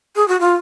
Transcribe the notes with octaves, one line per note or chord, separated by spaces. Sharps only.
G#4
F#4
F4